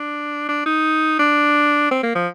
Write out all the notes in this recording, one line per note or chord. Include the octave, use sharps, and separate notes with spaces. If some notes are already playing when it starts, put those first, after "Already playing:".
Already playing: D4
D4
D#4
D4
C4
A#3
F3